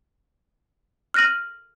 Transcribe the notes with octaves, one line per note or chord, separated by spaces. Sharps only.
F6 F#6 A#6 D#7 F#7